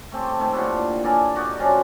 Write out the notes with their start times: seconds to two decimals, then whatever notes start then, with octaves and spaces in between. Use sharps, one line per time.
0.12 A3 C4 G4 A4
0.38 C3 D#3 A3
0.53 A#2 D3 D4 E4
1.03 A4 A#4 D5 G#5
1.36 F#4 G4 D5 D#5
1.59 F#2 F3 C#4 D4